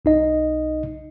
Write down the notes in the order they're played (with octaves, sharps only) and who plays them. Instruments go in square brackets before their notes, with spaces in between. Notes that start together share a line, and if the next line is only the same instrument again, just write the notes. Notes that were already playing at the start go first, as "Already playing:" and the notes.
[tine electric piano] B1 D#4 D#5